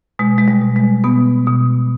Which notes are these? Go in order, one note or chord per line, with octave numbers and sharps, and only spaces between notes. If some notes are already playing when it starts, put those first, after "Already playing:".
B2 G#3
G#3
G3
B2
G#3
B2 B3
B2